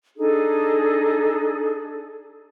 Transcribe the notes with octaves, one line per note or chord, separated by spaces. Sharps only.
D4 D#4 G#4 A4